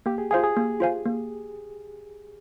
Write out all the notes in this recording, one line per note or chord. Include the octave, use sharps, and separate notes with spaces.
A#3 G4
G#4
F4 G#4 C5 F5 G#5
G#4
A#3
F4 C5 F5 G#5
A#3